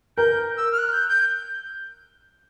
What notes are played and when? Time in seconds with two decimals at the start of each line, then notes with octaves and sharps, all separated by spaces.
0.17 A#4 G6
0.57 E6
0.72 F6
0.78 F#6
0.93 G6
1.08 G6